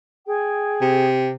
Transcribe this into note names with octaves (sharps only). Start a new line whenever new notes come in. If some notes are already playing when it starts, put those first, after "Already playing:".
G#4 G5
C3